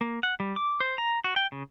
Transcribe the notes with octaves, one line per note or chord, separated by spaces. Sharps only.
A#3
F#5
G3
D6
C5
A#5
F#4
G5
C#3